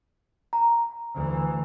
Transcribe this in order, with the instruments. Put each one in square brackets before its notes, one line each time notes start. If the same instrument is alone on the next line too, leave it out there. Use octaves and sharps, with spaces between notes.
[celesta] A#5
[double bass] D2 E3